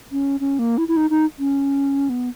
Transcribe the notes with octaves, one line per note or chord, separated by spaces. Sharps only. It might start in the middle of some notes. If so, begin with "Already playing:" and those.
C#4
C#4
A#3
E4
E4
D#4
D#4
C#4
B3